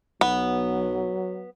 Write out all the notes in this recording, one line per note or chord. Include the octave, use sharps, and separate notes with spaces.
B1 F#3 B3